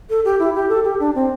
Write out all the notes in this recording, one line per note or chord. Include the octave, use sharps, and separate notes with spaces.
A4
G4
E4
G4
A4
G4
D4
C4